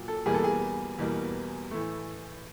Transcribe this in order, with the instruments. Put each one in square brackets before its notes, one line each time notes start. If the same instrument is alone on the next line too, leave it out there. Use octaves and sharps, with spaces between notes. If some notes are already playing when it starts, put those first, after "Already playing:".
Already playing: [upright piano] A#2 F#3
A4
E2 B2 G3 A#3 G#4
A4
G#4
E2 B2 G3 A#3
A2 E3 A3